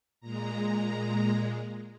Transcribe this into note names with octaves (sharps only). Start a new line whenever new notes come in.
A#2 G#3 A#5